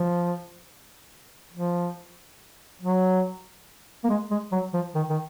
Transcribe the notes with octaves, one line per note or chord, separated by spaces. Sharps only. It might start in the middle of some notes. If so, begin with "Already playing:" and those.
Already playing: F3
F3
F#3
A#3
G#3
G#3
F#3
F3
D#3
D#3